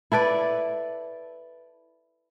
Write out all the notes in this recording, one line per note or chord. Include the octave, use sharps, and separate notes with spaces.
E4 A4 B4 D5